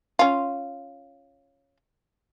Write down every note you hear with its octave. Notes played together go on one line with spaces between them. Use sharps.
C#4 F4